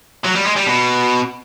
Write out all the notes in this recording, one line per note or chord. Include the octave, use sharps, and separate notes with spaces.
F#3
G3
G#3
G3
B2